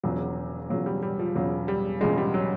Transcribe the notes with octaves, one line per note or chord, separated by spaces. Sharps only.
E1 E2 C#3 F3 F#3
E1 E2 C#3 F3 F#3
G3
G3
F3
E1 E2 C#3 F3 F#3
G3
E1 E2 C#3 F3 G#3
G3
F#3